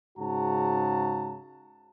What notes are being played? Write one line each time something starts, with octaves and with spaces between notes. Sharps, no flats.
G#2 C#3 F#4 A5 A#5